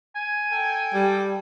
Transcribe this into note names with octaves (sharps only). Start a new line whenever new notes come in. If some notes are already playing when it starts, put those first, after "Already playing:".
G#5
A4 G5
G3